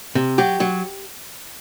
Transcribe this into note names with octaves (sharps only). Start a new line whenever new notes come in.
C3
F#3 G4
F#3